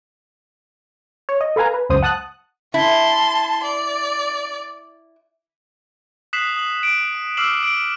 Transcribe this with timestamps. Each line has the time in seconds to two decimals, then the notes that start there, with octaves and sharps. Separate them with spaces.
1.29 C#5
1.41 D#5
1.56 A4 B4 F5 G#5 A#5
1.74 B4
1.89 C#2 F#2 C5 D#6
2.03 F#5 A5 D#6 F#6
2.74 E4 A5 C6
3.64 D5
6.33 D#6 F#6 B6 C7 E7 F#7
6.57 D#6 F#7
6.83 D7
7.37 D6 E6 F6 C7 E7 F#7
7.63 D7